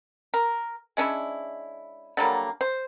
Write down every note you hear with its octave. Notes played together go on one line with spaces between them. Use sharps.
A#4
G#3 C#4 D4 E4
D3 F#3 G3 A#3
C5